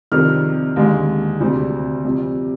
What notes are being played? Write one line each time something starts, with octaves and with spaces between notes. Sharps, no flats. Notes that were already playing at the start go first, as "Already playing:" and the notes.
F2 C3 D#3 G3 F6
D#2 D3 G#3
D2 C3 G3
F2 C3 G3